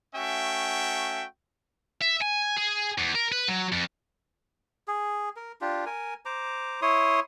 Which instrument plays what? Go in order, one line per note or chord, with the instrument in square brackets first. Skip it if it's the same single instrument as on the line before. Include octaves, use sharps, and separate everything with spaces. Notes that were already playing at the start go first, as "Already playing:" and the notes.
[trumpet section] A3 C#4 F#4 E5 G5
[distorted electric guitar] E5
G#5
G#4
E2
A#4
B4
F#3
F2
[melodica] G#4
A#4
D4 F4 G4
A#4 G#5
C5 A#5 D6
E4 C#5 C6 D#6